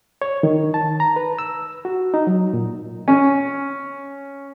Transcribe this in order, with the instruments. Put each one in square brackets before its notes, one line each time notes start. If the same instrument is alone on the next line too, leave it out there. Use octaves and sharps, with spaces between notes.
[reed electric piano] C#5
D#3
A5
A#5
B4
E6
F#4
D#4
F#3
A#2
[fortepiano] C#4